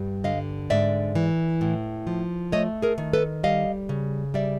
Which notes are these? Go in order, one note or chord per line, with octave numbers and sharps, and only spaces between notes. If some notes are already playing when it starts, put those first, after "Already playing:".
Already playing: G2 G3
D3 D#5 F5
G#2 D5 E5
E3
A2
F3
A3 C#5 D#5
G#4 A#4
D#3
A4 B4
G3 D#5 F5
C#3
G3 D5 E5